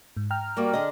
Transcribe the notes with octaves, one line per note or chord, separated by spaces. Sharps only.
G#2
G5 A#5 F6
G3 A#3 F#4
D3 G#4 D#5